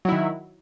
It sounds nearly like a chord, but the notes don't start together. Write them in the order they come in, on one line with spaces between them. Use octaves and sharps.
F#3 E4 D#3